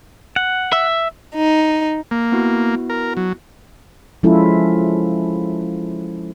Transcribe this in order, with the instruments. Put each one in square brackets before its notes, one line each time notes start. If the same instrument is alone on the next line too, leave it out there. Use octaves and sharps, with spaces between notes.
[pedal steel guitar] F#5
[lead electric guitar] E5
[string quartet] D#4
[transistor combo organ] A#3
[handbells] B3 E4 F#4
[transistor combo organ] A#4
F#3
[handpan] F3 G#3 C#4 E4 F4 A4